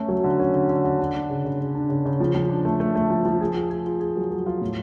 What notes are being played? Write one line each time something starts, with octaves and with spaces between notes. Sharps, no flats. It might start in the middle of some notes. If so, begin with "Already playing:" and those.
Already playing: A3 C#4
F#3
D3
C#4
D3
D3
D3
D4
D4
C#3
C#3
C#3
D4
C#3
C#3
F3
F3
D4
A3
A3
A3
F3
F3
G#4
F4
G#4
F4
G#4
F#3
F#3
F4
A2